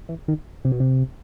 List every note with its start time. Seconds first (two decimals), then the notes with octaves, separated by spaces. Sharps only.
0.09 E3
0.28 D#3
0.65 C3
0.72 B2
0.80 C3